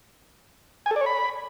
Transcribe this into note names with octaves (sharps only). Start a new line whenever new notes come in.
G#5
A4
D5
C#5
B5